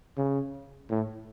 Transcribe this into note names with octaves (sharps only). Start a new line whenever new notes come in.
C#3
A2